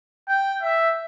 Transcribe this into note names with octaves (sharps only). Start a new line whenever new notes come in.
G5
E5